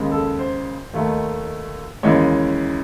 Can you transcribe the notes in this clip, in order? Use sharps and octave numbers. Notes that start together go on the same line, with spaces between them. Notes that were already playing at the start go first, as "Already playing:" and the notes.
Already playing: D#2 C#3 G#3
A4
C5
D#2 D#3 A3
D#2 C#3 E3 G#3 C#5